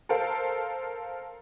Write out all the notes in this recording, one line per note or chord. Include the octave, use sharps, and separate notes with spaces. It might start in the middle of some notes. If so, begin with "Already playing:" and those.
A4 A#4 C5 F5